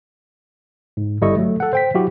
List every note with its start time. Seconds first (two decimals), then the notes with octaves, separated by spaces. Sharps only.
0.97 G#2
1.21 G1 G3 E4 A4 D#5 C#6
1.36 F#3 A3
1.60 A4 F#5
1.73 C5 G5 B6
1.94 F#3 E4 F#4 G4